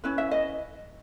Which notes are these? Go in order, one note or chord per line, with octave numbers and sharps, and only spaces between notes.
C#4 E4 B4
E5
D#5